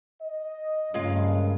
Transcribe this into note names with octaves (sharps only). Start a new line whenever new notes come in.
D#5
G2 C#3 G#3 A#3 F4 F5